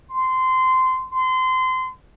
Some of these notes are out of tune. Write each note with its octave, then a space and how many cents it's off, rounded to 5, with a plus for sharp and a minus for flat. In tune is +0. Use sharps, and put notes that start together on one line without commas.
C6 -20
C6 -25